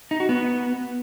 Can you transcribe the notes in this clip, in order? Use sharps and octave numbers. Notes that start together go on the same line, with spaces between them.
D#4
F#4
B3